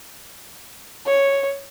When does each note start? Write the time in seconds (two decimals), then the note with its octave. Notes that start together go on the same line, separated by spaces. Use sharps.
1.06 C#5